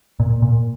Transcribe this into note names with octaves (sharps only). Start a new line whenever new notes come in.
A#2
A#2